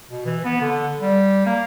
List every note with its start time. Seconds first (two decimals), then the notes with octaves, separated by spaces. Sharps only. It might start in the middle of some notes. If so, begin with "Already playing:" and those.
0.10 B2
0.25 E3
0.45 B3
0.61 D3
1.01 G3
1.46 A#3